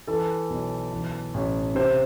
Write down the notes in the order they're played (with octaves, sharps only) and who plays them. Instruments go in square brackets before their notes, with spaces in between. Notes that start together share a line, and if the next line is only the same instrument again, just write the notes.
[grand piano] E3 A4
B1
E3
A1
C3 C5